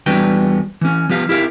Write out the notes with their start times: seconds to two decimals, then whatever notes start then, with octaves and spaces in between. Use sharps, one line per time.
0.06 E2 G3 D4 F#4 B4 G5
0.81 E3 C#4
1.09 F3 B3 G4 F5
1.29 E4 G4 A#4 F5